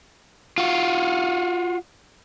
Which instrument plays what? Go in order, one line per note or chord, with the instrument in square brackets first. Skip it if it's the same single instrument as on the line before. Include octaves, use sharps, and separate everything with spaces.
[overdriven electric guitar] F4 F#4